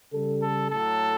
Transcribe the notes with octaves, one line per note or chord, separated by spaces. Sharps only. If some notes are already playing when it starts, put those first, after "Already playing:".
C#3 G3 A4
A4
A2 F#3 A4